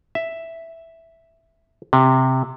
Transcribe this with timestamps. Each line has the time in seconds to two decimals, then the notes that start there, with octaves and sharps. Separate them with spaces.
0.15 E5
1.93 C3